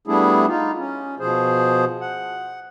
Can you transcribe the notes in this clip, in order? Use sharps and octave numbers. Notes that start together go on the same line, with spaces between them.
G3 A3 B3 D4 E4 G#4
D#4 F4
C#4
B2 F3 G#4 C5
F#5